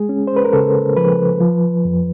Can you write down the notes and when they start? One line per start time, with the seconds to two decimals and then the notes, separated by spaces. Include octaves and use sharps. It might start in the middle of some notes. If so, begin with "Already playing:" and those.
Already playing: G#3 G#4
0.09 C#4
0.27 C5
0.36 B4
0.45 A#4
0.53 C#3 A4
0.97 F3 B4
1.41 F3
1.85 F2